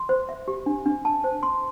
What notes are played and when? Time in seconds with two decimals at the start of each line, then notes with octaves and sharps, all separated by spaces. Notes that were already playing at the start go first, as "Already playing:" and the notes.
Already playing: C6
0.09 C5
0.29 E5
0.48 G4
0.66 D4
0.86 D4
1.05 A5
1.24 C5
1.43 C6